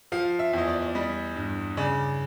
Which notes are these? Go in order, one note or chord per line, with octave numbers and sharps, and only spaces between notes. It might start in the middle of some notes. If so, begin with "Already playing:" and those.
F3 F5
E5
E2 D#5
D5
D5
G3 D#5
G2
C#3 D5